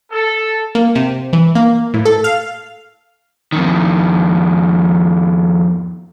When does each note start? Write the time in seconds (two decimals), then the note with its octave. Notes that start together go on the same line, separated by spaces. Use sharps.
0.11 A4
0.75 A#3
0.95 C3
1.33 E3
1.55 A#3
1.94 A2
2.05 A4
2.24 F5
3.52 F2 D#3